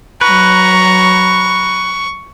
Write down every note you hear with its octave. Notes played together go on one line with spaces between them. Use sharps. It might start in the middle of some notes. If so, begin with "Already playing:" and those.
F#3 B4 A#5 C#6